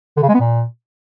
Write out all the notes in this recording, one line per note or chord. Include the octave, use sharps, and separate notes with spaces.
D3
C#3
G#3
B3
A#2